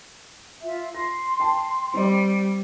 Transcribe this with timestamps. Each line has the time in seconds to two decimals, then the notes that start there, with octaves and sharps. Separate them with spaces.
0.62 F4 E5
0.95 C6 A#6
1.40 G5 A5
1.94 G3 C4 D5